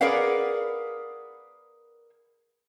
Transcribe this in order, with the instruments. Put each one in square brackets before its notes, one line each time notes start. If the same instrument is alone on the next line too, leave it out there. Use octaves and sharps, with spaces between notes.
[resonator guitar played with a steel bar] G#4 A#4 B4 D5 F5 F#5